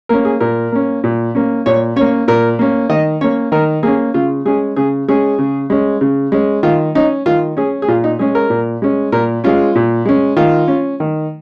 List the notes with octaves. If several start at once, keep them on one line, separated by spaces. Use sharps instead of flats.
A#3 C#4 A#4
G#4
A#2 A#4
A#3 C#4
A#2
A#3 C#4
A#2 C#5
A#3 C#4 C#5
A#2 A#4
A#3 C#4
D#3 D#5
A#3 C#4 C#5
D#3 A#4
A#3 C#4 G#4
C#3 F4
G#3 C#4 G#4
C#3 G#4
G#3 C#4 G#4
C#3
G#3 C#4
C#3
G#3 C#4
D#3 F4
C#4 D#4
D#3 F4
C#4 G#4
G#4
A#2 F4
D#4
G#3 C#4 G#4
A#4
A#2
G#3 C#4
A#2 A#4
G#3 C#4 F4
A#2
G#3 C#4
D#3 F4
C#4
D#3